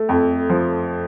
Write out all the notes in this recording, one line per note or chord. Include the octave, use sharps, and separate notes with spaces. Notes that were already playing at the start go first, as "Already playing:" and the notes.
Already playing: A3
F2
F3